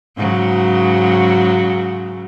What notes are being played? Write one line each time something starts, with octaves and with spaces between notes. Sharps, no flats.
G#2 C#3 F#3